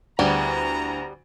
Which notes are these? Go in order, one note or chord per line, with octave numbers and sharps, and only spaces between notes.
D2 G3 B3 E4 G#4 A#5